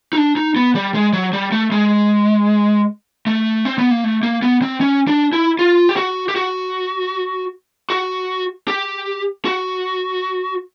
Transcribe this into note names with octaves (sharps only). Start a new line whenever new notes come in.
D#4
D4
D#4
B3
G3
G#3
F#3
G3
A3
G#3
A3
C4
B3
A#3
A3
A#3
B3
C4
C#4
D4
E4
F4
G4
F#4
G4
F#4
F#4
G4
F#4